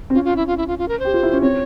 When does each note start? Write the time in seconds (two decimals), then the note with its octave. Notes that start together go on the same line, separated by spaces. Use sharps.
0.10 C4
0.14 C#4 F4
0.25 F4
0.36 E4
0.47 F4
0.57 E4
0.67 F4
0.78 F4
0.88 A#4
1.00 C5
1.05 G4
1.14 F4
1.23 E4
1.32 C#4
1.42 C4 C#5